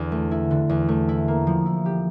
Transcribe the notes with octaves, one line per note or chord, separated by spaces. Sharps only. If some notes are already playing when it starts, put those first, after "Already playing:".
Already playing: E2 D3
A3
E4
D3
E2
A3
E4
A#3
F3
E4
G4